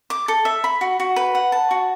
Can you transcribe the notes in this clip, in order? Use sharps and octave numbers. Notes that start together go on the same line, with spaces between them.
D6
A4
E5
B5
F#4
F#4
B4
F#5
A5
F#4